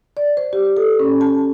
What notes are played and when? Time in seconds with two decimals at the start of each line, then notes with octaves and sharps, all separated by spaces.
0.17 D5
0.37 C5
0.53 G4
0.77 A4
1.00 C#4
1.21 A5